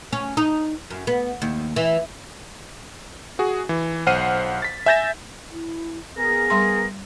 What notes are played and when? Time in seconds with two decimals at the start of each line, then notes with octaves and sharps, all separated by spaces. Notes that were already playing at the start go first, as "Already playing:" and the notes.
0.13 C#4
0.37 D#4
0.90 F#2
1.07 B3
1.42 D#2
1.76 E3
3.39 F#4 G#4
3.69 E3
4.06 B1 C5 F#5 F6 C7 D#7
4.62 A6 B6
4.86 E5 G#5 G6 A6 A#6 E7
5.51 E4
6.18 B3 G#4 A#4 A#6
6.50 G3 C6